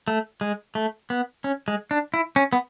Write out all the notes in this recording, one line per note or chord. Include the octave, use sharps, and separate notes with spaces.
A3
G#3
A3
B3
C#4
G#3
D4
E4
C#4
B3